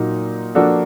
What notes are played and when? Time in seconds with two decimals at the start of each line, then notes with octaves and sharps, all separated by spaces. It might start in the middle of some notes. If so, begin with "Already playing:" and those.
Already playing: A#2 F#3 A#3 D#4
0.55 F3 A#3 D4 F#4 A4